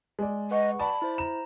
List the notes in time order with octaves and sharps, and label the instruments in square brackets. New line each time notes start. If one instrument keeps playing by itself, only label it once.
[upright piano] G#3 D5
[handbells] B4 F#5 C#6 [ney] D#5
[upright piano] D5 A5 [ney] B5
[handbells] E4 C5
[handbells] A#5 [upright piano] E7